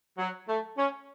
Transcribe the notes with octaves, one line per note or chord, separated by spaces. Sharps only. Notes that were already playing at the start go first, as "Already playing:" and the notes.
F#3
A3
C#4